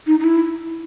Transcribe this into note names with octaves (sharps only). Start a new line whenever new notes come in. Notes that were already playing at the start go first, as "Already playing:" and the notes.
D#4
D#4
E4